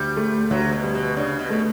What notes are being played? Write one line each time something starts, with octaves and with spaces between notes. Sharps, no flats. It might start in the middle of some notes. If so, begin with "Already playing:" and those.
Already playing: D2 G3
A3
D2 F#3
B2
G3
B2
C#3 D4
B2
B2 A3